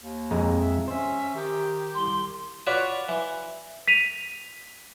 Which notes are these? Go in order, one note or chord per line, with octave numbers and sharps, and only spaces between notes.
D#2
F2 G#3 A#5
E5
C#4 C5 E5
D#3 G4
C2 C6
F4 F#4 B4 C#5 D5
E3
B6 D#7 F7